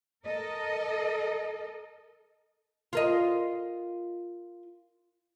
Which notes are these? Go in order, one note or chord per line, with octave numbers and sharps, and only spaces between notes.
A4 A#4 D#5
F4 A#4 D#5